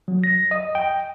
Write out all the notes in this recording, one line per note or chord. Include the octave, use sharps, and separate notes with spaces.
F#3
A#6
D#5
G5